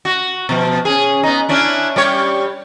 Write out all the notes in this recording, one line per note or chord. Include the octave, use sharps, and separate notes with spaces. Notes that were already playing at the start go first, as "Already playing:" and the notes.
F#4
B2 F3
C#4 G#4
B3 D#4
C#4 D4 E4
G3 G4 C#5